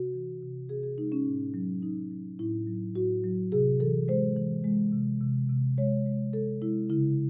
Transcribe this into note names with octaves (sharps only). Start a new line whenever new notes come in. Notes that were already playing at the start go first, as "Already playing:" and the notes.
Already playing: C3 F#4
E3
C3
C3 G#4
G#4
G#3 D#4
C#4
A2
F#3
F#3 D#4
F#3
A2 E4
F#3
A2 F#4
F#3
C3 G#4
E3 A4
G#3 C5
E3
G#3
C3
C3
C3
G#3 C#5
G#3
G#3 A4
G#3 E4
C#3 E4